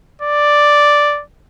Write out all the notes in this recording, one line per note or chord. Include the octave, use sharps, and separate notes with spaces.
D5